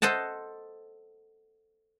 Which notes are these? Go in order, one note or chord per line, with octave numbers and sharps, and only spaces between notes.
A4 C5 D#5 F#5 A5